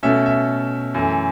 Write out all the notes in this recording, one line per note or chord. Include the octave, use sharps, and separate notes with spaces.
B2 A3 C#4 E5
E5
F#2 E3 A3